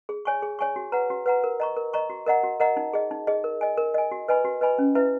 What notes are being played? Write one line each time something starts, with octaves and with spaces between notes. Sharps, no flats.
G#4
C#5 G#5 C#6
G#4
C#5 G#5 C#6
F#4
B4 F#5 A#5
F#4
B4 F#5 A#5
A#4
D#5 A#5 C#6
A#4
D#5 A#5 C#6
F#4
A#4 D#5 F#5 A#5
F#4
A#4 D#5 F#5 A#5
D#4
G#4 D#5
D#4
G#4 D#5
A#4
D#5 G#5
A#4
D#5 G#5
F#4
B4 D#5 G#5 B5
F#4
B4 D#5 G#5 B5
C#4
E4 B4 E5